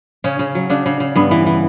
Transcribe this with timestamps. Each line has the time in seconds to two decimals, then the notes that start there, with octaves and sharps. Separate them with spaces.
0.24 C#3 C#4
0.39 C#3
0.55 F#3
0.70 C#3 D4
0.86 C#3
1.00 C#3
1.16 G2 B3
1.31 E3
1.46 E3